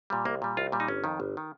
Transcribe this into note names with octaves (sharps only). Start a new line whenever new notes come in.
A#2 G3
C2 A#3
A#2 G3
C2 F4
A#2 G3
D#4
G1 C#4
F2 D#3
G1
D#3